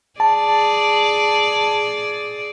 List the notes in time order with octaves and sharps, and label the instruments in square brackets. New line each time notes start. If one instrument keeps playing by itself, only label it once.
[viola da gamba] G#4 D5 [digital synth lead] A5